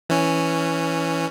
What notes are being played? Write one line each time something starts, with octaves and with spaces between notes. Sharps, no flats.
E3 C#4